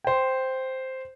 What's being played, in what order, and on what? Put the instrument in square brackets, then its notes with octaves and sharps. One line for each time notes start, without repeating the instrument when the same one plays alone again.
[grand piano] C5 G5